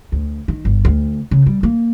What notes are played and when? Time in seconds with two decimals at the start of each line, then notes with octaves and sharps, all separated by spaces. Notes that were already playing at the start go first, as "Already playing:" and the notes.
0.12 D2
0.48 D#3
0.65 G1
0.85 D2
1.31 C#3
1.46 G3
1.63 A#3